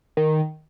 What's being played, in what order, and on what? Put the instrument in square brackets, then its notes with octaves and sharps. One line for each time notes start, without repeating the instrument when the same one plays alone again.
[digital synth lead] D#3